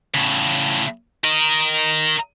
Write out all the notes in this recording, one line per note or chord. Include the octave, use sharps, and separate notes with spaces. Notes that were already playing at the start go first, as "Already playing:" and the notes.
A2 C#3
A#4 D#5